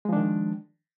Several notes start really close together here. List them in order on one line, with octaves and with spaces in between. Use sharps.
G#3 F3 D4 D#3